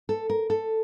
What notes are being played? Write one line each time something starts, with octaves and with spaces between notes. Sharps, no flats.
A4
A#4
A4